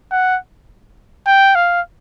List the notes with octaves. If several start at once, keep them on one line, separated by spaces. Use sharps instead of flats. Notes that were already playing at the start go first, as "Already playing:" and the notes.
F#5
G5
F5